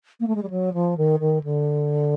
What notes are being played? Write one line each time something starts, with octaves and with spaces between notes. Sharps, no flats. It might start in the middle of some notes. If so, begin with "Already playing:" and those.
A#3
A3
G#3
G3
F#3
F3
D#3
D#3
D3